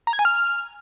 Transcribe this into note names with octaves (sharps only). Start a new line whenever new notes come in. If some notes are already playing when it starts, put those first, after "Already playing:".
A#5
G#6
G#5
F6